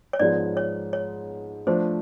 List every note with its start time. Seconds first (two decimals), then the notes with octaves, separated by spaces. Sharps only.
0.13 C#5
0.19 G#2 F3 G#3 B3 D5
0.57 C#5
0.93 C#5
1.67 F3 A3 D4 C5